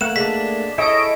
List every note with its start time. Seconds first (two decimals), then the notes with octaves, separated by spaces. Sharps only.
0.01 A3 A#3 F#5 E7
0.16 G#3 D4 B6
0.78 E4 G#4 A4 C#5 D#5 D7